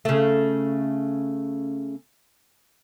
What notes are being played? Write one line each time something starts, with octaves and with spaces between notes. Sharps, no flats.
C#3 A3